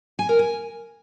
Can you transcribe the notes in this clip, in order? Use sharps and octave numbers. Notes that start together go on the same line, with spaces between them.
G#5
A#4
G#5